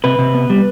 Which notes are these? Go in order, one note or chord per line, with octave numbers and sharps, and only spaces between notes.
C3 B4
C3
B3
G3